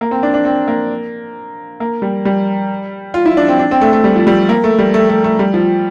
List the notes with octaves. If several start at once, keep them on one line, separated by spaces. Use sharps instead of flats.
A#3
C4
D4
D4
C4
A#3
A#3
G3
G3
F4
E4
D4
C4
D4
C4
A3
A3
G3
F3
G3
A#3
A3
G3
A3
A3
A3
G3
F3